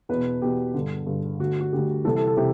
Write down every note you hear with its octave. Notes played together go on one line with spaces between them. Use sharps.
E2 B2 B4
E2 B2 G4
G2 D3
G2 D3
D2 D3 F#4
F#4
D2 D3 G4
C2 C3 E3 A4
A4
A4
C3 E3 G4